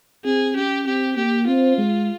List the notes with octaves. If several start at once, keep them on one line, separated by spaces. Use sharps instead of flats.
C4 G#4
C#4 G4
C4 G4
A#3 G4
C4 F4
G#3